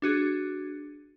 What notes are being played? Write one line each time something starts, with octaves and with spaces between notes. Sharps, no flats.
D4 F#4 G#4